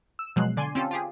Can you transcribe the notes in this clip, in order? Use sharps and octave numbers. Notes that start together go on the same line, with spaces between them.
E6
B2 F3 F#3 G#3 F#6 C7
D3 D5 G#5 C6 D#7
C4 C#4 F4 G4 A4
F4 G4 G#4